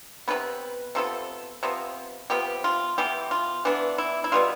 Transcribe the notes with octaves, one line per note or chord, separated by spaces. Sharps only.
C3 F3 B3 B4
C3 F3 B3 A4
C3 F3 B3
C3 F3 B3 G4
F4
E3 B3 G4
F4
E3 B3 D4
E4
E4
B2 G3 B3 F4